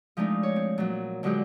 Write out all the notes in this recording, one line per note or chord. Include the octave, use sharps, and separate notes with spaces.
F3 G#3 A3 D4 D#4
C#5
C4
A#2 F#3
D3 F#3 G#3 F4 G4